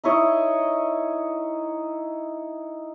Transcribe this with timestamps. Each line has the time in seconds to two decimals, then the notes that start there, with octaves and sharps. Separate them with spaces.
0.04 D#4 E4 C#5 D#5